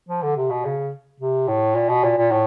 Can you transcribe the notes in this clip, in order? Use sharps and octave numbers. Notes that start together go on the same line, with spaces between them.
F3
D3
C3
B2
C#3
C3
A2
A#2
B2
A#2
A#2
A2